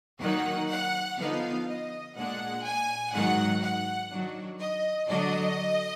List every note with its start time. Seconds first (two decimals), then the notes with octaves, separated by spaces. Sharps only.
0.20 D#3 F#3 A#3 D#4 F#5
0.69 F#5
1.18 D3 F3 B3 D#4 F5
1.67 D#5
2.16 A#2 G#3 D4 F#5
2.64 G#5
3.12 G#2 D#3 F#3 F#5
3.61 F#5
4.11 D#3 F#3 D4
4.59 D#5
5.08 D3 F#3 D4 D#5